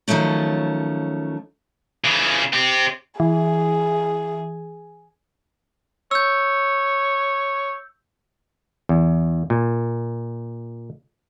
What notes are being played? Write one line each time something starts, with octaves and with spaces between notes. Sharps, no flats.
D#3 F3 F#3 A3 C#4
C#3 E3
C4 G4
E3 G#4
C#5 E6 G6
E2
A#2